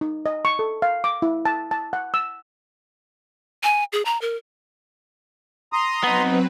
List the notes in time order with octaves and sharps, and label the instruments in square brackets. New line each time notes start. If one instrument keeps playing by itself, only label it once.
[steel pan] D#4
D#5
C#6
A4
F5
D6
E4
A5
A5
F#5
E6
[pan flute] G#5
G#4
A#5
A#4
[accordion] A#5 C6 D#6
[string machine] F#3 C4 B4 [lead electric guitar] B3 D#4